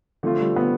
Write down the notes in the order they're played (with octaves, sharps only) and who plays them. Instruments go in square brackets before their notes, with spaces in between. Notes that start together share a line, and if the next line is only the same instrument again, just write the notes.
[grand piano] D3 A3 C4 F4 [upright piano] F3
[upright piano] G3
B3